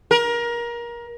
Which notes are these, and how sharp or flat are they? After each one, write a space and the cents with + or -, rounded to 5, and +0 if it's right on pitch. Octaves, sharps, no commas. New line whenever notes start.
A#4 +25